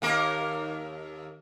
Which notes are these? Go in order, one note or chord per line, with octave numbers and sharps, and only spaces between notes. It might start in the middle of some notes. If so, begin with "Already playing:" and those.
D#2 A#3 A#4